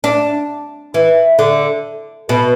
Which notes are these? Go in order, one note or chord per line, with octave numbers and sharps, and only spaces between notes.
D4
E3
D3
B2